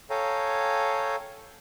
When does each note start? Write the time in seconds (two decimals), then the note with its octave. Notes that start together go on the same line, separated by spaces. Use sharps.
0.10 A4 C#5 F5 G5 G#5 A#5